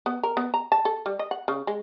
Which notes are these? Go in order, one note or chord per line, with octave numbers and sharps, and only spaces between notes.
B3
A#4
B3
A#5
A5
A4
G3
D#5
F#5
C#3
G#3